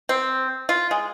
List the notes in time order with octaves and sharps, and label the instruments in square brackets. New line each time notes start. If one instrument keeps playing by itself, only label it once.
[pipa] C4
F4
G#3